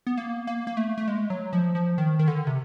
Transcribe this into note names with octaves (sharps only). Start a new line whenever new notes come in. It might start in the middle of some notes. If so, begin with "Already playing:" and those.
B3
A#3
A#3
A#3
A3
A3
G#3
F#3
F3
F3
D#3
D#3
D3
C3